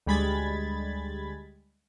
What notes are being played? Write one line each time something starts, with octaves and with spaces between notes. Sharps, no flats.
D2 G3 G#3 B5 G#6 A6